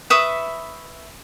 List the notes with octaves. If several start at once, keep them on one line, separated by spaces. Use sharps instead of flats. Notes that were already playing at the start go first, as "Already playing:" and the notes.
B4 E5 C#6 D#6